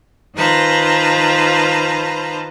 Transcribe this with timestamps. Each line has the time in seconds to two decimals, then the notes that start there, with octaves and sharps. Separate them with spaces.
0.34 D#3 F4 B4 C5 A5 A#5